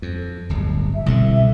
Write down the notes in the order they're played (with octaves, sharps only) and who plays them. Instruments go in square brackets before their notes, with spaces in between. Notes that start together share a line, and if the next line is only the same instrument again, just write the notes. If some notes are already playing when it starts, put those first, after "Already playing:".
[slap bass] F2
D1 G1
[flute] E5
[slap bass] C2 D3 [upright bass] B2 B3